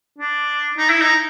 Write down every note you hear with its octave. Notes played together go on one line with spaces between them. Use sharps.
D4
D#4
E4
D#4